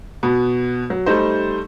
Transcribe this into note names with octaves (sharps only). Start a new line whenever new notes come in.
B2 B3
F#3
G3 A3 D#4 C5